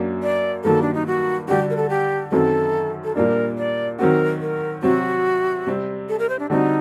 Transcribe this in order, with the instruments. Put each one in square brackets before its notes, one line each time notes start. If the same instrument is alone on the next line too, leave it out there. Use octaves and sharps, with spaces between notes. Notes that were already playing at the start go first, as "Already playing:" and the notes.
Already playing: [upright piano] F#2 F#3 A#3 D4
[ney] D5
[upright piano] G2 D#3 F#3 A#3 [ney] A4
[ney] D4
D#4
F#4
[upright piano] D3 G3 D4 F#4 [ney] G4
[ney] A#4
A4
G4
[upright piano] F#2 D#3 F#3 C4 [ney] A4
[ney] A4
[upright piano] A#2 G3 A#3 D4 [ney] A#4
[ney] D5
[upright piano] D#3 F#3 C4 F#4 [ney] A#4
[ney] A#4
[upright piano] C3 F#3 C4 [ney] F#4
[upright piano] C3 G3 C4
[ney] A4
A#4
C5
D4
[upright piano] D3 G3 C4 F#4 [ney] D#4